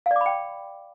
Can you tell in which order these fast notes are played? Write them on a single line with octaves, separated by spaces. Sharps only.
F5 D5 D6 B5 G5